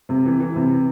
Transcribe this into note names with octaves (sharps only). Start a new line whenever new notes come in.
C3
E3
E3
C3